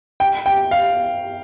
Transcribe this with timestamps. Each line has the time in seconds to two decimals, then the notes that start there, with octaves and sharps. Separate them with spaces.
0.20 G5
0.46 G5
0.71 F5